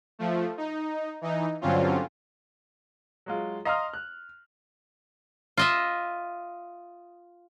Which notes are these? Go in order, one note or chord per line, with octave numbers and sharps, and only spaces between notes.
F3 A3
D#4
E3 D#4
G2 D3 F#3 C4 C#4 F4
F#3 G#3 F4
D#5 F5 A#5 C6 D#6 F6
F#6
F4 D#5 E5